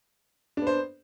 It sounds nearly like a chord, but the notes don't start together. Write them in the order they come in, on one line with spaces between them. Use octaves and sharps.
D4 B3 C5